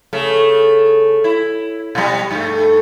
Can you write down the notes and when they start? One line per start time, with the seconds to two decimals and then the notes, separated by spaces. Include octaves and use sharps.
0.13 C#3 A3
1.24 E4
1.95 B2 G3
2.31 G2 A3